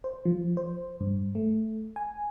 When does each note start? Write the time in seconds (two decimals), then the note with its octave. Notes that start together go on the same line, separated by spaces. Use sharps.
0.04 C5
0.25 F3
0.57 C5
1.00 G2
1.35 A3
1.96 G#5